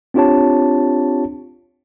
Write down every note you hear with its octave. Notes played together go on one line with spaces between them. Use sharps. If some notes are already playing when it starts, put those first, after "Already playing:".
C4 D4 F4 G4 C#5 A5